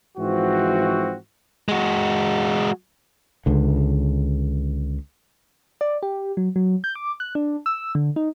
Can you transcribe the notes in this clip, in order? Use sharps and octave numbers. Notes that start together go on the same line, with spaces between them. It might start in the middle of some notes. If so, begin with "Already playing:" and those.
G#2 E3 F3 C4 F#4
G#3 F#4
C#2 D3
D5
G4
F#3
F#3
G6
D6
F#6
D4
E6
D3
D#4